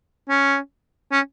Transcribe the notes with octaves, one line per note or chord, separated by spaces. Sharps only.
C#4
C#4